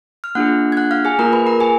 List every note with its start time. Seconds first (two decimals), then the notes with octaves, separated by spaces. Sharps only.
0.24 F6
0.35 A#3 D4 F4 G#4 F#5 F#6
0.72 G#6
0.77 F#5 F#6
0.91 F5 F6
1.05 G#4 G#5
1.19 A#3 F4 G#4 A#4 A#5
1.32 B4 B5
1.46 A#4 A#5
1.60 G#4 G#5